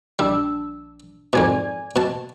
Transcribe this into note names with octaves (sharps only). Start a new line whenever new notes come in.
A#1 G3 D4 E6
F2 G#2 B2 D5 G#5 G#6
B2 A5